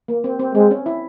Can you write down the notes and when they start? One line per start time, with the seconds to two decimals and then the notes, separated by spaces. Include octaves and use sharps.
0.08 A#3
0.24 C4
0.40 C4
0.55 G#3 C4
0.71 C#4
0.86 E4